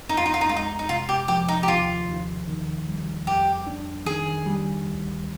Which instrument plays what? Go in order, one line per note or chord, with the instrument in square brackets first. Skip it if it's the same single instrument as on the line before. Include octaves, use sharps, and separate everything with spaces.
[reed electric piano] F2 [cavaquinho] D#4
[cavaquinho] F4
D#4
F4
D#4
[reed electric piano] G#3 [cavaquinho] F4
[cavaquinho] D#4
D#4
[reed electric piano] C3 [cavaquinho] F4
[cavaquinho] G4
[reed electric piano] F3 [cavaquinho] G4
[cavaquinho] D#4
G4
[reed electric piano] D#2 [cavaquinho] F4
[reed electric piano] D#2
D#3
G3
[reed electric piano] F2 [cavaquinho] G4
[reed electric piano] D4
[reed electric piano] D#3 [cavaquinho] G#4
[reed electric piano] G3
D2